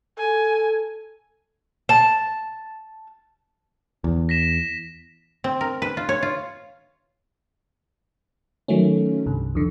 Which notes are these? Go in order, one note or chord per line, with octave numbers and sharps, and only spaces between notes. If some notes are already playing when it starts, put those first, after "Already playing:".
A4 G#5
A5
E2
A#6 B6 E7
C4
A#4
B4
F4
C#5
F4
D#3 F#3 A3 C#4
C2 G2
F2 D3